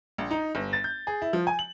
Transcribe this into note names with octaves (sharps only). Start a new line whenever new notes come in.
A#1
D#4
G1
A6
G6
G#4
E4
F3
G#5
F#7